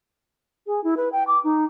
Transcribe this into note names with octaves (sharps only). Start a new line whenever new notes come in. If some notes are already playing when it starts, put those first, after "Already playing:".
G#4
E4
B4
G5
D6
D#4